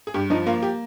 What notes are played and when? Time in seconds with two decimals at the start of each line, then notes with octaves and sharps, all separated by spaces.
0.07 G#4
0.14 G2 G4
0.30 F3 D#4
0.46 A#3 F4
0.62 G4